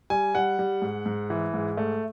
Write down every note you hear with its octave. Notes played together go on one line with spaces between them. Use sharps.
G3 G#5
G3 F#5
G3
G#2
G#2
E3
G#2
A3